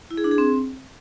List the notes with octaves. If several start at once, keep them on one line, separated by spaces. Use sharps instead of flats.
E4
G#4
D4
G#4
C4